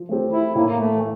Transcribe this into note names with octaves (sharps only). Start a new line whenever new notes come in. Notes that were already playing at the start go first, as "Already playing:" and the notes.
Already playing: F3
A3 C4 G4
E4
A2 A#3
A#3
A3
E3